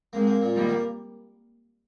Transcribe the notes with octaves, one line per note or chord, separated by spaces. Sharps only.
G#3 A#3 C4
A#3
A#2
D#3 G3 A#3
A#3